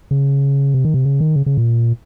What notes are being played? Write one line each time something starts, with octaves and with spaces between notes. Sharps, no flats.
C#3
C3
D#3
C3
C#3
D#3
C#3
C#3
A#2